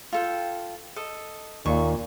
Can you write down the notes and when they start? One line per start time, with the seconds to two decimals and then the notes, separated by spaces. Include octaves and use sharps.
0.12 F4 A4 G5
0.96 A4 D#5
1.66 D#2 A#2 C#6